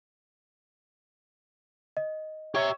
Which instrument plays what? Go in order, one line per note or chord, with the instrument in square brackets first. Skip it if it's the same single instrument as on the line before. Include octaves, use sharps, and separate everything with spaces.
[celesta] D#5
[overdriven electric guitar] G4 E5 [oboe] C#5